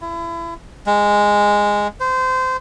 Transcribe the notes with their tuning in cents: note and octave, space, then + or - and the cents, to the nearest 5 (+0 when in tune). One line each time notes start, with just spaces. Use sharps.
E4 +35
G#3 -10
C5 -25